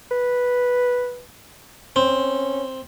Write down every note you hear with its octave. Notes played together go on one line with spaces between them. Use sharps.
B4
C4 C#4